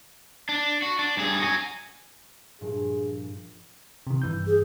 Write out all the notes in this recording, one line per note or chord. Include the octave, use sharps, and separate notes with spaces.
D4
F#4
D4
G2 G#4
F#4 G#5
G2 A#2 F3 G#4
C3 D#3
G2 E3 G6
G#4